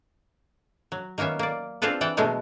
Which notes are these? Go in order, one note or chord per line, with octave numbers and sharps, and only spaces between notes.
F#3
D#3 A#3 B3 C#4 E5
A#3 D5
C4 D4 F4 G#4 A4 B4
E3 F#5 G5 A5
B2 F#3 G#3 A3 B3